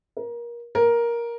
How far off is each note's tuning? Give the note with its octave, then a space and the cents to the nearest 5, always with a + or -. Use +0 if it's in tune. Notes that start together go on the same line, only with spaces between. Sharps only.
A#4 +25
A#4 +10